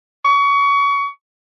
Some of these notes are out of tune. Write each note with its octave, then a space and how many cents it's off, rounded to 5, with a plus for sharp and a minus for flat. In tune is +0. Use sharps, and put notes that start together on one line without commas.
C#6 +30